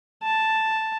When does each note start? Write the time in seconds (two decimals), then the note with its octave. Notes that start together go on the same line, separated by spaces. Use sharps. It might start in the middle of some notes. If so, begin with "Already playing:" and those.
0.23 A5